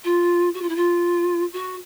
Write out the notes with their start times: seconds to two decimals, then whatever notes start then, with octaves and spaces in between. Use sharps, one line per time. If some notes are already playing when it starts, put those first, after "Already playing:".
0.04 F4
0.54 F#4
0.61 F4
0.68 E4
0.75 F4
1.53 F#4